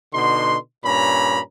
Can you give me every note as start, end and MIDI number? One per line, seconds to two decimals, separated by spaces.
0.13 0.56 47
0.13 0.56 50
0.13 0.56 63
0.13 0.56 84
0.84 1.40 43
0.84 1.40 46
0.84 1.40 61
0.84 1.40 82
0.84 1.40 83